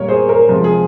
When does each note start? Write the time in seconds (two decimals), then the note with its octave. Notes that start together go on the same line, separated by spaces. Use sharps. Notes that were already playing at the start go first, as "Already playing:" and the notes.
Already playing: A#2 G3 A#3 A#4 C#5
0.08 G#4 C5
0.29 A#4
0.49 C3 F3 G#3
0.64 G#4